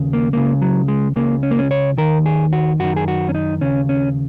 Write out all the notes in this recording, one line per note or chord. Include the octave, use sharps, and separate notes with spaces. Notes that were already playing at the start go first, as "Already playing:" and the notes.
Already playing: D#2 C#3
A#3
C#2 C#3 A#3
F#3
G#3
C#2 C#3 A#3
C#4
A#3
C#4
C#5
D#2 D#3 A#4
G#4
F#4
F#2 D#3 F#4
G#4
F#4
C#4
D#4
D#2 C#3 C#4
C#4